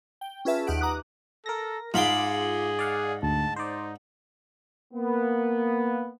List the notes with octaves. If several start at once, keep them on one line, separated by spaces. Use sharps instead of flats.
G5
C#4 F4 G#4 B4 E5 A5
D#2 D#4 G4 B4 F#5 D7
F#5 A#5 D6 D#6 F#6
A4 A#4 A#6
G#2 F4 G#4 B5 C6 D6
D5 F5 F#5
D2 A5
D#4 C5 D5
A#3 B3